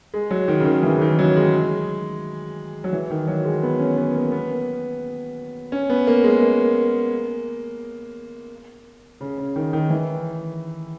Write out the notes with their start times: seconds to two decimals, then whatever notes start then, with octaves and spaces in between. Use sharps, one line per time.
0.14 G#3
0.31 F#3
0.48 D#3
0.60 C#3
0.66 D#3
0.83 E3
0.97 C#3
1.01 D#3
1.19 F#3
1.36 G#3
2.84 F#3
2.93 E3
3.11 D#3
3.28 F#3
3.45 G#3
3.63 B3
3.79 C#4
3.97 B3
4.15 A#3
4.32 B3
5.72 C#4
5.90 B3
6.07 A#3
6.24 G#3
6.41 A#3
9.21 C#3
9.38 C#3
9.56 D#3
9.73 D#3
9.90 E3